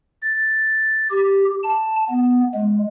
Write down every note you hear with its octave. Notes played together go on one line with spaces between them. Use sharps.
A6
G4
A5
B3
G#3